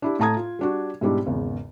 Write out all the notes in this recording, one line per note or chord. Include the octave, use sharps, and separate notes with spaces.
D4 E4 G4
A2 A4 A5 A#5 D#6 G#6
F4
G3 D4 F#4
G#2 B2 G3 D4 E4
G#1 E2 C#3